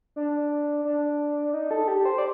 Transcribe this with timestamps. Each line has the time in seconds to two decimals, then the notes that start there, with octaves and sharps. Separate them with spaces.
0.16 D4
0.85 D4
1.54 D#4
1.71 A4
1.88 G4
2.05 C5
2.18 D5